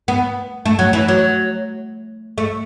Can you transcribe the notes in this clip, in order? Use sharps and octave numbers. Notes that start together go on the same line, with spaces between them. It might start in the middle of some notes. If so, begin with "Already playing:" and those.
B3
A3
F#3
E3
F#3
A3